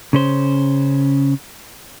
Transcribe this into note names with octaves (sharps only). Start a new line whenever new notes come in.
C#3 C#4 C5